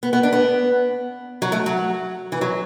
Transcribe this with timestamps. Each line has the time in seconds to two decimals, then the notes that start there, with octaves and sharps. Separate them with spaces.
0.03 B3
0.13 B3
0.23 D4
0.33 B3
1.42 F#3
1.52 A3
1.66 F#3
2.32 E3
2.41 F#3